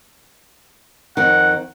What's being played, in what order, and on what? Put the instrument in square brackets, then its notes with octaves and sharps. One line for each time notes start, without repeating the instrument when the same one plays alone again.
[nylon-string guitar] F2 D#3 [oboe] F#5